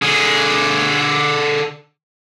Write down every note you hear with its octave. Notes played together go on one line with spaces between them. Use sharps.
D3 G#4